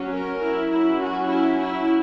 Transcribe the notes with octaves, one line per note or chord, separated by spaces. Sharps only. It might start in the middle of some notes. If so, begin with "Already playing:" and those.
Already playing: F#3 C#4
A#4
E4
F#3 C#4 E4
F#4
E4
E4